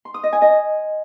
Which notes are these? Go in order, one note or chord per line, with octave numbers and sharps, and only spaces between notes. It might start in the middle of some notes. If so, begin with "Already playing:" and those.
C6
D#6
D#5
G#5
D#5